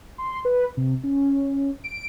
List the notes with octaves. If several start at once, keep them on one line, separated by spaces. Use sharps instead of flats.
C6
B4
C3
C#4
D7